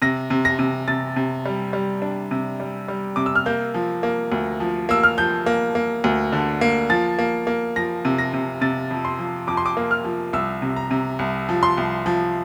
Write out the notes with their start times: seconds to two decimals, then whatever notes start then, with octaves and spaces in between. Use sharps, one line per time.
0.02 C3 A#6
0.30 C3
0.45 A#6
0.59 C3
0.88 C3 A6
1.16 C3
1.46 G3
1.73 G3
2.02 D4
2.31 C3
2.60 G3
2.88 G3
3.16 C3 D6
3.26 E6
3.35 F6
3.46 A#3 G6
3.74 F3
4.03 A#3
4.32 D2
4.60 F3
4.89 A#3 E6
5.03 F6
5.18 F3 G6
5.46 A#3
5.75 A#3
6.04 D2
6.32 D3
6.61 A#3
6.90 F3 A6
7.19 A#3
7.47 A#3
7.76 F3 A#6
8.05 C3
8.18 A#6
8.34 C3
8.61 C3 A6
8.91 F2
9.05 C6
9.19 F3
9.47 F2 D6
9.57 C6
9.66 D6
9.77 A#3
9.91 F6
10.05 F3
10.33 C2 E6
10.62 C3
10.76 A#5
10.91 C3
11.19 C2
11.49 F3
11.63 C6
11.77 C2
12.06 F3